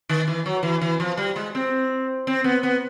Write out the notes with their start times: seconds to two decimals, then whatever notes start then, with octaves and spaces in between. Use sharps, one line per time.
0.09 D#3
0.28 E3
0.46 F#3
0.63 E3
0.81 E3
1.00 F3
1.17 G3
1.36 G#3
1.55 C4
2.27 C4
2.44 B3
2.63 B3